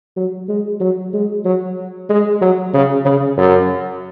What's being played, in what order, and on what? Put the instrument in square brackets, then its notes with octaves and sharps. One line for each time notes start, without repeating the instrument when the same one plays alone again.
[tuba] F#3
G#3
F#3
G#3
F#3
G#3
F#3
C#3
C#3
F#2